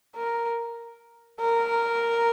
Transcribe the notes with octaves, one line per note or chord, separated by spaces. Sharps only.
A#4
A#4